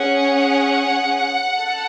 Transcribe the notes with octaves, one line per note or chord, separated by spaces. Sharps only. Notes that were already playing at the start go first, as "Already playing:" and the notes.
Already playing: C#4 G#4 F#5
A4